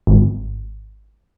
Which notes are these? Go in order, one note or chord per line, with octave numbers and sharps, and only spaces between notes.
G#1